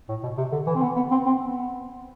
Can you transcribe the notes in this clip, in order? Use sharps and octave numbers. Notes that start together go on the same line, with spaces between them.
A2
B2
C3
D3
E3
C4
B3
B3
C4
C4
B3